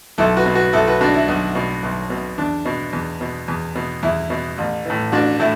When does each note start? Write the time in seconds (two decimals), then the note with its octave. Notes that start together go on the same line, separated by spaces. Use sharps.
0.18 B1 E4 A4
0.36 F#4 B4
0.46 B2
0.55 F#4 B4
0.73 B1 E4 A4
0.87 F#4 B4
1.01 B2 D4 F#4
1.14 E4
1.28 B1
1.55 B2
1.83 B1
2.10 B2
2.38 E2 D4
2.65 B2
2.93 E2
3.21 B2
3.48 E2
3.75 B2
4.03 E2 E4
4.30 B2
4.58 A1
4.85 A2 E3
5.12 A1 D4 F#4
5.39 A2 E4